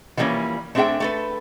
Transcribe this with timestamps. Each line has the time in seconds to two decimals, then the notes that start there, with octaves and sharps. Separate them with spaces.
0.17 E3 F3 G3 A#3 C#4
0.75 A3 C4 D4 G#4 E5 G5
1.00 A3 A4 B4